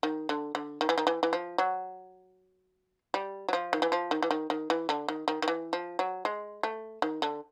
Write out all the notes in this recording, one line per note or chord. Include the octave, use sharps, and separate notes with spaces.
D#3
D3
D3
D#3
E3
D#3
E3
E3
F3
F#3
G3
F#3
F3
D#3
E3
F3
D#3
E3
D#3
D#3
E3
D3
D#3
D#3
D#3
E3
F3
F#3
G#3
A3
D#3
D3